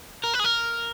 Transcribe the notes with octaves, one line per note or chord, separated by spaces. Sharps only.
A#4
B4
G#4
A#4